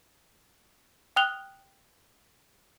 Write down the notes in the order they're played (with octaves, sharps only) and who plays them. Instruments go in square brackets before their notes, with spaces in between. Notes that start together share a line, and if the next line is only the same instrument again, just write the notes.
[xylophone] G5 D#6 F6 F#6 F7 G7